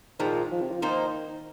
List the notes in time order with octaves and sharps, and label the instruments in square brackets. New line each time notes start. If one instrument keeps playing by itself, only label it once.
[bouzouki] A#2 F3 G#3 [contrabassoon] D#3
[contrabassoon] F3
C3
F3
[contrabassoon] D#3 [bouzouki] F3 A#3 D#4 C5